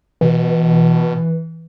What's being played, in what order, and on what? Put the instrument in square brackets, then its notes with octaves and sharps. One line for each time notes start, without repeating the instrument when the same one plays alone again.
[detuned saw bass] B2 [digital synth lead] E3